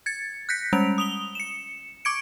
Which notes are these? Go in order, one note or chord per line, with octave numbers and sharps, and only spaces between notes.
G#6 A6 C#7
F#6 G6 A#6 B6 C#7
G3 G#3 C#4 D7 F7
D#6 F7 G7
C#7 E7
C#6 D6 G#6 C#7 D7